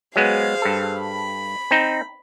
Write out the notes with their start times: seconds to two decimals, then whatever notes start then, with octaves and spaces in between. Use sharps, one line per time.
0.16 F#3 G#3 B3 G#4 C5 F5
0.62 G2 A4
1.02 B5
1.71 C4 D#4